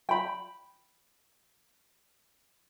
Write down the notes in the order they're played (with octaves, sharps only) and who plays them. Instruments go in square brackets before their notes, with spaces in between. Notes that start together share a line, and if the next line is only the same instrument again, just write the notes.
[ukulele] G5 B5